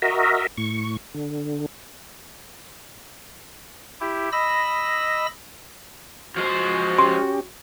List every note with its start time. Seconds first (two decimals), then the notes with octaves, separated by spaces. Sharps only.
0.02 F#4 A#4 D#5 E5
0.57 A2 C#6
1.14 D3
4.01 E4 G4
4.32 D#5 B5 E6 A#6
6.36 F3 G#3 F#4 C5
6.98 C#4 G4 C6